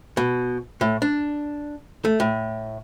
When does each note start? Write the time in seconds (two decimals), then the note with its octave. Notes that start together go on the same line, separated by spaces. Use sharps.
0.17 B2
0.81 A2
1.02 D4
2.05 A3
2.20 A2